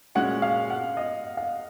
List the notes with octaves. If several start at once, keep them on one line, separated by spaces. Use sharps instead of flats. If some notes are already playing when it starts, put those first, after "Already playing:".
A#2 G#3 C#4 F#4 F#5
F5
F#5
D#5
F5